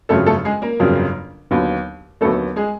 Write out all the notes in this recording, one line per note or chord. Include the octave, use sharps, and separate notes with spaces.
G1 F2 C#3 F#3 A3 A4
A3 A4
G#3 G#4
A#3 A#4
G1 F2 C#3 F#3
D#2 D3 F#3 B3
D#2 D3 F#3 A3 B3 A4
G#3 G#4